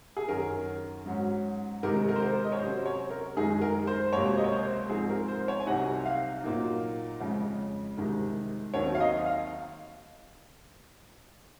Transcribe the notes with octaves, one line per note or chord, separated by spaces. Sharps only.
G#4
F#2 D#3 F#3 C#4 A#4
G#2 F#3 C#4
C3 D#3 G#3 D#4 A#4
A#4
C5
A#4
D#5
C#5
C3 F#3 C#4 C5
C#5
A#4
F#2 D#3 G#3 D#4 G#4
A#4
C5
C#2 C3 F#3 A#3 C#5
D#5
C#5
C5
G#2 F3 C4 D#4 G#4
A#4
C5
C#5
G#5
C2 C3 F#3 C4 D#4 F#5
F5
A#2 F#3 A#3 D#4
F2 C#3 G#3 C#4
C2 C3 D#3 G#3
D#2 D#3 F#3 C4 C#5
F5
D#5
F5